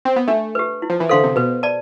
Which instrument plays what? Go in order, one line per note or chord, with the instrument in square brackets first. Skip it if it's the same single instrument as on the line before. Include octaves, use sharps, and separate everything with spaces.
[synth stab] C4
B3
[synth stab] A3 [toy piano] D4
[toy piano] G4 B4
E4
[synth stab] F3
E3
[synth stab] D3 [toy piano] A4 C5 F5 C6
[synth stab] C3
[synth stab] B2 [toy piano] B4
[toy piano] D5 A5